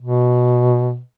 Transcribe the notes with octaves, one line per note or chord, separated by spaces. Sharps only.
B2